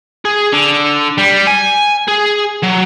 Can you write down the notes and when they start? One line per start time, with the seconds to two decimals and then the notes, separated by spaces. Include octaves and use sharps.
0.25 G#4
0.52 D3
1.18 G3
1.47 G#5
2.08 G#4
2.63 F#3